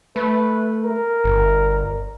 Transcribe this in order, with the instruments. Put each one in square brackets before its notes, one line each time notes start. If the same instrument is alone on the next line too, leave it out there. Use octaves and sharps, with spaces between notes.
[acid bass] A3 [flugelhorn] B4
[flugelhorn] A#4
[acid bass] G1